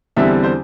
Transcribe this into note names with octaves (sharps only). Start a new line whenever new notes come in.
E2 D3 G3 C4 E5
C5